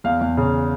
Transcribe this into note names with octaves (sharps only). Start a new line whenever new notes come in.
E2 F5
E2
C#3